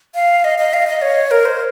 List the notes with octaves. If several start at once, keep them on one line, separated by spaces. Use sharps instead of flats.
F5
D#5
D#5
F5
D#5
C#5
A#4
C5